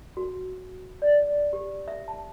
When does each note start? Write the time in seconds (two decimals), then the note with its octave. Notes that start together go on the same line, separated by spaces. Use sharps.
0.17 F#4
1.02 D5
1.53 G4
1.88 E5
2.08 A5